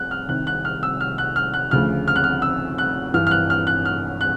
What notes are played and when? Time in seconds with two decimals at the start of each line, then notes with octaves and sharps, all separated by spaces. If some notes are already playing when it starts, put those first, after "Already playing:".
Already playing: F#6
0.11 F6
0.29 C2 C3 D#3 F#6
0.47 F#6
0.65 F6
0.83 E6
1.01 F6
1.18 F#6
1.36 F6
1.54 F#6
1.71 D2 C#3 F3 F6
2.08 F6
2.16 F#6
2.24 F6
2.42 E6
2.78 F#6
3.14 G2 E3 F6
3.27 F6
3.31 F#6
3.50 F6
3.67 F#6
3.85 F6
4.21 F#6